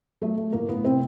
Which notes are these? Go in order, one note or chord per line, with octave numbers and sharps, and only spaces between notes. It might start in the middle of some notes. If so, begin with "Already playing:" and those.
F#3 A3 A4
A3
A2 A#3 A#4
A2 B3 B4
C3 C4 C5